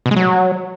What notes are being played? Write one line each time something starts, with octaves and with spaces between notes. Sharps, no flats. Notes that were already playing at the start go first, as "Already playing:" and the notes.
B2
G#3
F#3